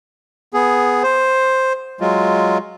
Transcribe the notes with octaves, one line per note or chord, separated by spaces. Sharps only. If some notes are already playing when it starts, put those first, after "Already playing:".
B3 G#4
C5
F#3 G#3 F4